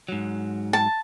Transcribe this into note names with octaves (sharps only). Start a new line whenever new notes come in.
G#2 F#3
A5